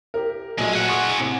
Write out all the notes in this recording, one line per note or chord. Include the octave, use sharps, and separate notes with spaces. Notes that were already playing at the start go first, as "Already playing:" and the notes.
G4 A#4
A#1 F#3 G#3 A3
G#4 F#5
C6 C#6 D#6
A1 C3